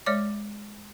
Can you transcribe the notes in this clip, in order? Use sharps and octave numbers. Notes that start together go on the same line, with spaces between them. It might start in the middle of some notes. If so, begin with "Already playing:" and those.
G#3 C#5 D5 D6